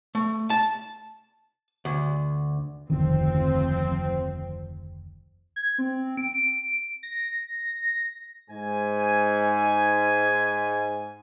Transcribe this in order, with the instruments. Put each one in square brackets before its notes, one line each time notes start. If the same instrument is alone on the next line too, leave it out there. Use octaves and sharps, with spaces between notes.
[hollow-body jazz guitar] A3
A5
D2
[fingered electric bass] F1 D2 D#3 [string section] F3 C4
[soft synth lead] G#6
C4
D7
A#6
[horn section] G#2 G#5